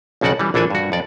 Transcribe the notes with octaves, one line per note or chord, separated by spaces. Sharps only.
B1 F2 C#3 F#4 D5 F#5
E3 G3
A#1 E3 D4 A4 D5 G#5
G2 F#4
F2 D5